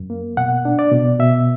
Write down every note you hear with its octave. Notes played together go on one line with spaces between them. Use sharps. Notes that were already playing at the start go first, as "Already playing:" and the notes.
Already playing: F#2
A#3
B2 F#5
D4
D5
B2
B2 E5